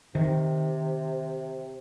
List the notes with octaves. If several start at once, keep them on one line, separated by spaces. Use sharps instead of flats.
C3 D#3